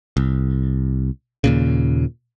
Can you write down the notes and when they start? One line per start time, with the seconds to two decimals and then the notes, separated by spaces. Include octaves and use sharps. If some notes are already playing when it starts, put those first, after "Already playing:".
0.17 C2
1.44 D#2 A#2 C#3